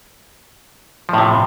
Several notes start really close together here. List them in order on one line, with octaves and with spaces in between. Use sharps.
F3 A2 C3